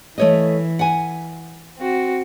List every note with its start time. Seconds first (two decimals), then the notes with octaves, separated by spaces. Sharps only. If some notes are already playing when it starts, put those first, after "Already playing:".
0.18 E3 A3 C#5 D#5
0.79 F#5 G#5
1.78 C4 F#4